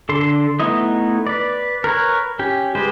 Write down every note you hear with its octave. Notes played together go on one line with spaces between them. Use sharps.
D3 A4 C6
A3 B3 D#4 E4 D#5
B4 D5
A#4 B4 C#5
C#4 G4
G#3 G4 B4 C5